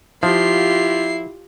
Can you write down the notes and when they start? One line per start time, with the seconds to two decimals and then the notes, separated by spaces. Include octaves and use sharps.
0.23 F3 E4 F4 G4 C7